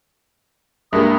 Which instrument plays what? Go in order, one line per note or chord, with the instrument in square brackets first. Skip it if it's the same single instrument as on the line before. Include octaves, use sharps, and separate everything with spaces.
[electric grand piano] G2 G#3 A#3 [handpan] G4 A#4 E5 [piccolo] D#6